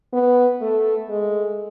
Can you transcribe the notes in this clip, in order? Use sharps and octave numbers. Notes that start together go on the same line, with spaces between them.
B3
A3
G#3